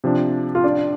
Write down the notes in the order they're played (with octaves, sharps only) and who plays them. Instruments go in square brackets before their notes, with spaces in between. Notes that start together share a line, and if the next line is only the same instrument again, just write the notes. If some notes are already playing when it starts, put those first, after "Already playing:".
[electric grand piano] C3 F3 D4
[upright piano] F4
D4